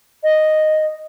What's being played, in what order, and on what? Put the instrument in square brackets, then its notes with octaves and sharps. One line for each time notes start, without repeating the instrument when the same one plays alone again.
[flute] D#5